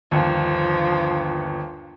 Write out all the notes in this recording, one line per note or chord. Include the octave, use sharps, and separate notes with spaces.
G1 D#2 F3